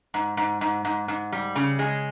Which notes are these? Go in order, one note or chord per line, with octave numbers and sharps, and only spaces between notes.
G#2
G#2
G#2
G#2
G#2
G3
C#3
G#3